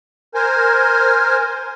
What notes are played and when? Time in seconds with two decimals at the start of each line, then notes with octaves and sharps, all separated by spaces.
0.35 A#4 C5 G#5